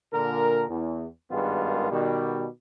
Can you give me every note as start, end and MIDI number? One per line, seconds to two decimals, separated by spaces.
0.13 0.64 46
0.13 0.64 50
0.13 0.64 70
0.70 1.07 40
1.31 1.88 32
1.31 1.88 43
1.31 1.88 51
1.31 1.88 56
1.31 1.88 59
1.31 1.88 65
1.91 2.46 47
1.91 2.46 51
1.91 2.46 55